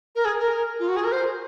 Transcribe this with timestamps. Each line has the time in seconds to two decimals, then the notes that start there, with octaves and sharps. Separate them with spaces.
0.15 A#4
0.25 G#4
0.40 A#4
0.79 F4
0.88 F#4
0.96 G#4
1.04 A#4
1.12 C5